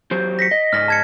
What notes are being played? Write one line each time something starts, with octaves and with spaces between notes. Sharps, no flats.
F#3 G4 C5
A#6 B6 C#7
D#5
G#2 D5 D#5 F6 A#6
A5 G#6 C#7